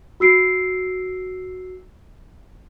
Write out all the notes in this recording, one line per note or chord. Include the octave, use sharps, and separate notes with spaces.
F#4 E6 C7 D7